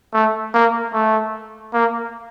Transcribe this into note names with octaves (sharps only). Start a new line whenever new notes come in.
A3
A#3
A3
A#3